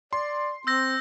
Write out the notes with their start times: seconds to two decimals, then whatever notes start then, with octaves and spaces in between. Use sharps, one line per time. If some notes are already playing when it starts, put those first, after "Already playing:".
0.13 D5 C6
0.67 C4 E6 G6 A#6